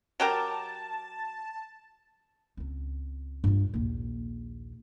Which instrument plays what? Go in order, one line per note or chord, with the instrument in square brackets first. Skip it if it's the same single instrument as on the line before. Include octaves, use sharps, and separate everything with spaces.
[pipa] F#3 G4 A#4 [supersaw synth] A5
[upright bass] C#2 C4
G2 F4
A#1 D#2